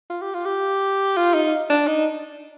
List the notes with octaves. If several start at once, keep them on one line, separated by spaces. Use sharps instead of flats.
F4
G4
F4
G4
F4
D#4
D4
D#4